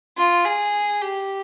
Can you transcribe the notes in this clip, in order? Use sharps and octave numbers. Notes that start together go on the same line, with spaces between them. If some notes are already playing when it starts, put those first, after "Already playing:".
F4
G#4
G4